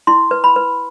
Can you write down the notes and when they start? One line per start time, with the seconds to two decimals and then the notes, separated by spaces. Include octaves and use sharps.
0.07 E4 C6
0.31 B4
0.44 B5
0.56 B4